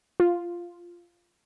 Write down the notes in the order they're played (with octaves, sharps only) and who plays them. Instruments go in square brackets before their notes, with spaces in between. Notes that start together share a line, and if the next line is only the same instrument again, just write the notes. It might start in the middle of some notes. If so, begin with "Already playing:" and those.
[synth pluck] F4